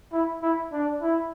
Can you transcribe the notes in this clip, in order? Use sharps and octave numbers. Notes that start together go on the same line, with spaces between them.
E4
E4
D4
E4